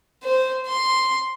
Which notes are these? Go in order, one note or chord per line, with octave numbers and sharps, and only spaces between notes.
C5
C6